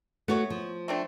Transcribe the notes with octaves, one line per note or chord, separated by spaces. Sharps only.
A3 B3 F#4 C#5
F3
A3 C4 D4